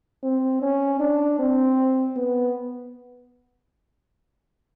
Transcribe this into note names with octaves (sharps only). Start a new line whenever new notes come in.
C4
C#4
D4
C4
B3